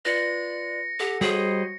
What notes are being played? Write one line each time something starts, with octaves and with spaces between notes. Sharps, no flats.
F4 B4 D5 A#6 C#7
G4 A4 F#5
G3 F#4 G#4 C5 C#5 D#5